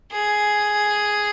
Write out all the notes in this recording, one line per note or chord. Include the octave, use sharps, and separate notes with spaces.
G#4